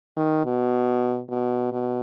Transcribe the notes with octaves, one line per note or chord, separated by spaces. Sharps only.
D#3
B2
B2
B2